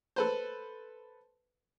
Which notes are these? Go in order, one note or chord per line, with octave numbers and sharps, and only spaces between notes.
A4 B4 C5